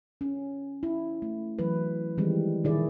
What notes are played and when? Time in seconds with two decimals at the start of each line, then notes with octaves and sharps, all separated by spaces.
0.21 C#4
0.83 E4
1.22 A3
1.59 E3 F#3 B4
2.18 D#3 E3 G3 G#3 C4
2.64 A#2 D3 D#3 E4 G#4 D5